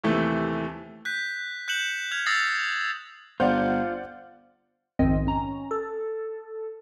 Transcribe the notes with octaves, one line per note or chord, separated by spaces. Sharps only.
D#2 C3 E3 A3
F#6 G6 B6
F#6 G6 C#7 E7 F#7
F6 G#6 F7
D#6 E6 A6 A#6 C7
G1 F4 C5 D5 F#5 G6
A#1 F2 G#2 D#3 C4 D#5
C#4 A#5
A4